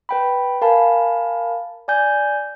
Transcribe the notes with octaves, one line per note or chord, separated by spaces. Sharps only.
B4 G5 B5
A#4 F5 G#5 A5 B5
D5 G#5 G6